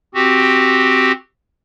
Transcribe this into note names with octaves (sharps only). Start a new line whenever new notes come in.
C4 F#4 G4